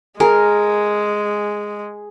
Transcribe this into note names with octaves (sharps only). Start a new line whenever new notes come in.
G#3 G#4 A#4 G#5